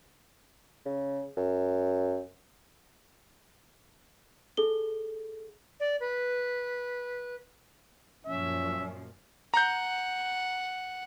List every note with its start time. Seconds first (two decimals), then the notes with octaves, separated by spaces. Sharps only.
0.86 C#3
1.37 F#2
4.57 G#4 A4 G7
5.80 D5
6.00 B4
8.25 F#2 A#2 F3 C#4 E5
9.54 F#5 A#5 G6